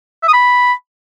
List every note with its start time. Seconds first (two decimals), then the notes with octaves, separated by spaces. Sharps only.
0.23 E5
0.28 D#6
0.33 B5